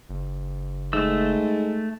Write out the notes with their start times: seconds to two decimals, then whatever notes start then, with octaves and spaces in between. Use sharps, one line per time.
0.09 F#1
0.93 G#2 A3 E6